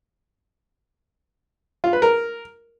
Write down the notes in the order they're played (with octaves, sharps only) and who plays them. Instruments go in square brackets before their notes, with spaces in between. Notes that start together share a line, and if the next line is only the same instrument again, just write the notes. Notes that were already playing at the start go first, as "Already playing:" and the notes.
[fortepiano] F4
B4
A#4